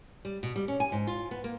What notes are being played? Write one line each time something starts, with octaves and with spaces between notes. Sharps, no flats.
G3
B2
G3
C#4
G#5
G#2
F4
B3
A#3